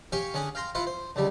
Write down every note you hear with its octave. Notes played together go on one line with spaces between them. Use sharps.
G4 C#5 F5 G5 G#5 C#6
D3 C#4 G#4 F#5
F5 G5 A#5 C6
E4 F4 C5 F5 F#5
C5
C#2 D3 G3